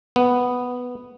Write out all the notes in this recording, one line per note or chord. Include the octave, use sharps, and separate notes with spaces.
B3